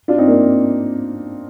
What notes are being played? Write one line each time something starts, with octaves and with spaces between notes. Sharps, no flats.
D4 F4
C4 D#4
A#3 D4